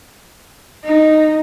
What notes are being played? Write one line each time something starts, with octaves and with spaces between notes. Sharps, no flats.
D#4